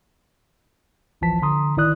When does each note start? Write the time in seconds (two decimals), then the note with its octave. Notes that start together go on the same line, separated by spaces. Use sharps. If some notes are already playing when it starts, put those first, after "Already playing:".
1.21 G#1 C#2 E3 F3 A5 B6
1.42 D3 A#5 C6 D#6
1.77 A1 D#3 E4 D5 D#6 F#6